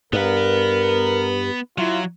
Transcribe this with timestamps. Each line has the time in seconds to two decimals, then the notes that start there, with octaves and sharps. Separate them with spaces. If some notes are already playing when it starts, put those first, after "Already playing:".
0.13 G2 B3 A#4 B4
1.78 F#3 E4 F4